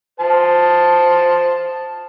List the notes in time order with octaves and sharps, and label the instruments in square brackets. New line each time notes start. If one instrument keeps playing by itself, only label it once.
[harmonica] C5 A5